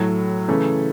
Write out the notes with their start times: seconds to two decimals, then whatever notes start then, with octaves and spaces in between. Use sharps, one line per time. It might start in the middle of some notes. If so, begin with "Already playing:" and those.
Already playing: A2 F#3 A3
0.48 C#3 E3 A3